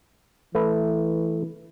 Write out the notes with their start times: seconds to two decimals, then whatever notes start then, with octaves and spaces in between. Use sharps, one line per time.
0.55 E3 A3 B4